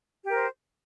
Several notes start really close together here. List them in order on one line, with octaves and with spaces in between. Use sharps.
G4 A#4 C5